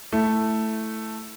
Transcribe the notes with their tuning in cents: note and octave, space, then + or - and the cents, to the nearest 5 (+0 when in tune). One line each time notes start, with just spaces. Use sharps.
A3 +0 E4 +0